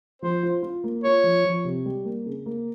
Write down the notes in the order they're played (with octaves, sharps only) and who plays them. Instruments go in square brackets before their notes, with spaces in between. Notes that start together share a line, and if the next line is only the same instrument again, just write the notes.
[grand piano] F3 [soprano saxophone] C5
[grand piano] F4
F4
A#3
[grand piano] F4 [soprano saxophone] C#5
[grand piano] F3
F3
C3
G3
A#3
C#3
A#3